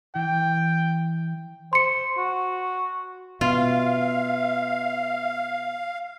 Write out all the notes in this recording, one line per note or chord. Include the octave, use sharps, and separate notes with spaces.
E3 G5
C5 C6 C#7
F#4
B2 F4 E5 F5